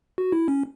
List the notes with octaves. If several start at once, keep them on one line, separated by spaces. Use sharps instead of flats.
F#4
E4
C#4